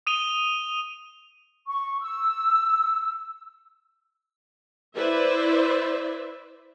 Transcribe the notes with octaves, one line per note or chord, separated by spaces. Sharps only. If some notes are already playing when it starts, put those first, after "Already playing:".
D#6 D#7 F7 G7
C#6
E6
E4 B4 C5 D5 E5